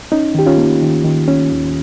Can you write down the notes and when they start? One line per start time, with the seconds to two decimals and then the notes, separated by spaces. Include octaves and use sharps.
0.12 C#4 D#4
0.35 D#3 G4
0.46 C#4 F4
0.58 A#3
0.82 D#3
1.05 D#3
1.28 C#4
1.52 D#2